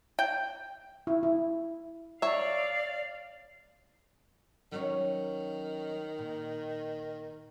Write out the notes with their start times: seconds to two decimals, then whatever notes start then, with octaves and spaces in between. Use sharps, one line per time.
0.19 G5
1.07 E4
1.23 E4
2.22 C#5 D5 E5 F5
4.72 D#3 F#3 C#4 C#5
6.19 A#2